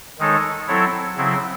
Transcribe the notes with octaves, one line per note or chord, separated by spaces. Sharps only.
D#3 G#3 D#4 A4 C#5
F#3 C4 E4 A4 C#5
C#3 F#3 C4 E4